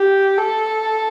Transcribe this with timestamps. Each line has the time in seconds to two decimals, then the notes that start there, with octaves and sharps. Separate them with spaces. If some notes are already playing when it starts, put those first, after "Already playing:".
Already playing: G4
0.37 A4